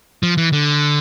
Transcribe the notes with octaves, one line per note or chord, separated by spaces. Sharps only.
F3
E3
D3